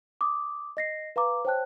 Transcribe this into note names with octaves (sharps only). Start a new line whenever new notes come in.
D6 D#6
D#5 A#6 C7
B4 F5 A#5 D6
C5 C#5 G5 A5 F#6